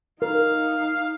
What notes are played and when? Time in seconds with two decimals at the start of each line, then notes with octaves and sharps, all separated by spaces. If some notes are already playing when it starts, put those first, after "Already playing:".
0.22 D#4 A#4 F5